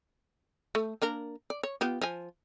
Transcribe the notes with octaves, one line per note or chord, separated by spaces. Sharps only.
A3
A#3 D4 A#4
D5
C#5
B3 F4 G4
F3 G#5